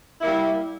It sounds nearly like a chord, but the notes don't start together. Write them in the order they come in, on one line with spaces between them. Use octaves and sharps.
E4 A#3 G3